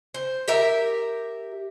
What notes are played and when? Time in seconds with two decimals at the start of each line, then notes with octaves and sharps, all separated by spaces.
0.14 C5
0.48 G4 A#4 E5